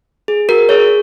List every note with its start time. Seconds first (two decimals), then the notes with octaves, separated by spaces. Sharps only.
0.28 G#4
0.49 F#4 A#4
0.69 G#4 C#5